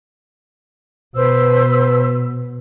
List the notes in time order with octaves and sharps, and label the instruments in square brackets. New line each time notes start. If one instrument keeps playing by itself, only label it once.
[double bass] B2 [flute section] B4 C5 E6